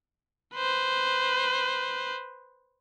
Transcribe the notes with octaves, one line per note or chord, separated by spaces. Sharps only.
B4 C5